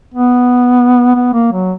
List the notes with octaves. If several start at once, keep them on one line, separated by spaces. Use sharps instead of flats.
B3
B3
A#3
F#3